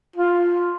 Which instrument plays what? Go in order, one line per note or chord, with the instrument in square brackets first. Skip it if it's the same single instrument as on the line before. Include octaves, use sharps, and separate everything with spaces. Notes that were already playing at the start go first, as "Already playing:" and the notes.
[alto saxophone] F4